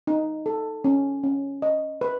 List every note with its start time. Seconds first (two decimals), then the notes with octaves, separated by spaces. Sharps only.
0.07 D#4
0.46 A4
0.84 C#4
1.23 C#4
1.62 D#5
2.01 B4